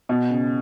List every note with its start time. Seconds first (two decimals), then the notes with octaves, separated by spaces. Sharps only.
0.09 B2
0.30 C#3